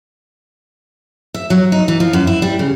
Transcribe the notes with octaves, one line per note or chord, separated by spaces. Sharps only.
E5
F#3
D#4
E3
F3
F#2
E4
G3
C#3